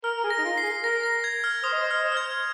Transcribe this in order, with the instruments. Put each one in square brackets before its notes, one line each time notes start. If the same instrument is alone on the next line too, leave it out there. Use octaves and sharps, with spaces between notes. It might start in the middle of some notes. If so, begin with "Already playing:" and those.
[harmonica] A#4 [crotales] F6
[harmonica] A#4
G#4
[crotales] A#6
[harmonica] D#4
F4
[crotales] C7
[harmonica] G#4
[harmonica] A#4 [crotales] A#6
[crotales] A#6
G#6
F6
[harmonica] C5 [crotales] D#6
[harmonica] D#5
C5
[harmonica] D#5 [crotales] F6
[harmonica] C5
[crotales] F6
G#6